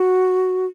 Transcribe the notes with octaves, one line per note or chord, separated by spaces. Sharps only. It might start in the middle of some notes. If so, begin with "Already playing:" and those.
Already playing: F#4